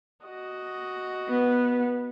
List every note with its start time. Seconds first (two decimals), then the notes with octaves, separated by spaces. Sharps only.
0.24 F#4 D#5
1.29 B3